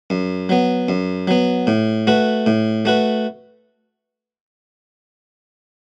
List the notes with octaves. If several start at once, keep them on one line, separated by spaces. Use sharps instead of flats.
F#2
F#3 B3
F#2
F#3 B3
A2
A3 F#4 B4
A2
A3 F#4 B4